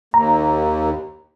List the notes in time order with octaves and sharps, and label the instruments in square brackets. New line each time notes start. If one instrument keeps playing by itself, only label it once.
[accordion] D#2 [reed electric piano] A#5